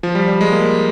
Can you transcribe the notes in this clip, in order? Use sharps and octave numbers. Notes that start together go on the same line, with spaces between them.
F3
G3
G3
G#3
A#3